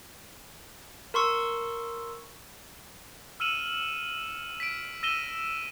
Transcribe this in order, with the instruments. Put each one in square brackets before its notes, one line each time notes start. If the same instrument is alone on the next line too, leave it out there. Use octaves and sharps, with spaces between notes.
[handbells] A#4 C6 C#6 E6
[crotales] E6 F6 C#7 D#7 E7 F#7
B6 D7
E6 A#6 D#7 E7 G7